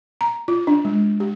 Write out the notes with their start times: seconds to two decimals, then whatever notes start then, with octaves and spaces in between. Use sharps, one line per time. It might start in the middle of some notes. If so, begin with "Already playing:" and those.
0.21 A#5
0.48 F4
0.67 D4
0.85 G#3
1.20 G4